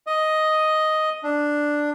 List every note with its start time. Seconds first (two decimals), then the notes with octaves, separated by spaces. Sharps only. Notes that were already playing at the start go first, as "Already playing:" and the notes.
0.07 D#5
1.23 D4